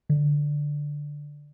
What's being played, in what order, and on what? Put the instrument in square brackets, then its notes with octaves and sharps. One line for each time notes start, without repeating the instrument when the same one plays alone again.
[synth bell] D3